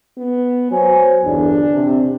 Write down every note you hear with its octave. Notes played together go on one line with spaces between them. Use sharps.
B3
F#3 C5 C#5 G#5
G1 E2 D4
C3